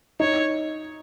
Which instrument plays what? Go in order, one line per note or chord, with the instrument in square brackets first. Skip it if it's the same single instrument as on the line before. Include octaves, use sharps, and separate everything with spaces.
[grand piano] D#4 [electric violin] C#5